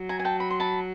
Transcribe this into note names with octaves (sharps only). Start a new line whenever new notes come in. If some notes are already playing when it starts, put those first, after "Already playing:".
Already playing: F#3
G#5 A#5
G#5
G5 A5
B5
C6
A5 B5